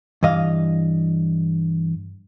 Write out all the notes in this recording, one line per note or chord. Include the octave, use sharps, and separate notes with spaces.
G2 E3 D#5 F5